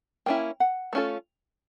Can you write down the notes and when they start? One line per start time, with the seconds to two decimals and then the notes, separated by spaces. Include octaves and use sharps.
0.26 A#3 C#4 E4 G5
0.60 F#5
0.93 A3 C#4 F4 A4